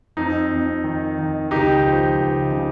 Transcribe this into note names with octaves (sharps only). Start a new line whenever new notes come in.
F2 D#4
F2
D#3
D#3
C#2 D#4 G4
F3
C#2
C#3